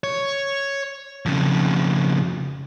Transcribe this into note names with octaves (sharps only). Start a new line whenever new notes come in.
C#5
F2 C#3